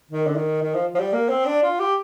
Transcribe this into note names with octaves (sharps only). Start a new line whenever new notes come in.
D#3
D3
D#3
D#3
F3
F3
G3
A#3
C4
D4
F4
G4